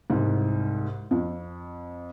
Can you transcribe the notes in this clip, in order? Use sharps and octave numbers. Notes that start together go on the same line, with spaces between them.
C2 G#2
F2